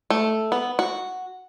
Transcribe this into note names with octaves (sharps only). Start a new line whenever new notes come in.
A3
B3
F#4